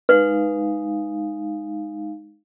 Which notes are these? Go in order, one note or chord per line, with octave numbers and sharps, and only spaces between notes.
G#3 D#4 B4 F5